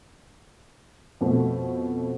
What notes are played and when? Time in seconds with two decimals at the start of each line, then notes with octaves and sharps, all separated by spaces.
1.21 F2 B2 A3